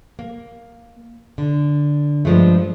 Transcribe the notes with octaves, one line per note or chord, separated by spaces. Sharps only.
A#3
D3
G2 F3 G#3 A3